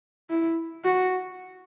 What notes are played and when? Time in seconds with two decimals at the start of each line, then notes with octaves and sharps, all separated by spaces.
0.30 E4
0.84 F#4